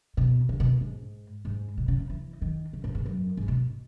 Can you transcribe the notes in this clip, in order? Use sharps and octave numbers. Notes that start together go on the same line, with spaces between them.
B2
C#3
B2
G#2
G#2
B2
C#3
D#3
E3
D#3
C#3
A2
G#2
F#2
G#2
B2